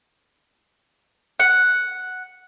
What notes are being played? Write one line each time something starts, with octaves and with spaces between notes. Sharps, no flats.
F#5